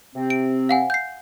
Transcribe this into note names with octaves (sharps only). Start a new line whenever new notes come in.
C3 C4
D7
F5 F#5 G#5
G6 C7